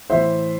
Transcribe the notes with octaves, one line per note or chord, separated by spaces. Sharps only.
A2 E3 C5 E5